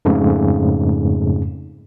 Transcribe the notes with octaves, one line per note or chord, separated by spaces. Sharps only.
F2 G#2 C#3 A3